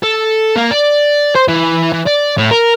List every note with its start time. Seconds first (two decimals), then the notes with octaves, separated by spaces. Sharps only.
0.03 A4
0.56 A#3
0.71 D5
1.35 C5
1.48 E3
1.92 E3
2.06 D5
2.38 A2
2.51 A#4